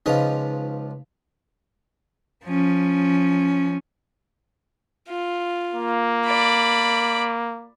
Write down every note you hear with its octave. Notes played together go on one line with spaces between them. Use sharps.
C#2 F3 D#4 B4 D#5 F5
F3 C#4
F4
A#3
D5 B5